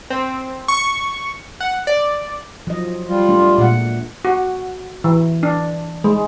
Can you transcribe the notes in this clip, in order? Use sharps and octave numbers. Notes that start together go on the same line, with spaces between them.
C4
C#6
F#5
D5
F3 F#3 D#5
G3 F4
A3 D4
A#2 G#3 F#5
F#4
E3
D4
G#3